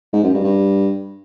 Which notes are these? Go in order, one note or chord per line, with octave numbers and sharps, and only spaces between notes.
G#2
F#2
G2
G2